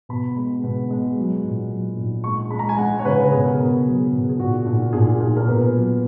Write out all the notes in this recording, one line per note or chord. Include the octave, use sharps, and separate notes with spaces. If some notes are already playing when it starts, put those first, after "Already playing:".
B2 B5
G#3
B2
G#3
F#3
A#2
F#3
A#2
G#3 C#6
G#3 B5
A#5
G#5
G#3 F#5
C#5
C#3 B4
B2 G#4
A#4
B2 G#4
F#3 G#4
B2
G#4
A#2 F#4
A#2
A#2 G#4
A#2
A#4
B2 B4
F#3